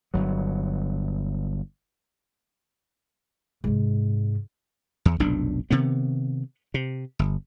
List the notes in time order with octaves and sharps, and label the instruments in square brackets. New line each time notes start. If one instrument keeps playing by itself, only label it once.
[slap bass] G1 F#3
[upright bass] G#2 C3
[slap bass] E2
F1 B1 A#2 D4
C3 D#3 B3
C3
G1